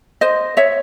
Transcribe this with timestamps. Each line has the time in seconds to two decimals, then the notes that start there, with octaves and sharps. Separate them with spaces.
0.21 C5 D#5
0.57 C#5 E5